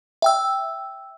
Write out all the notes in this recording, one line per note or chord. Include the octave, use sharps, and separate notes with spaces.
E5 G5 E6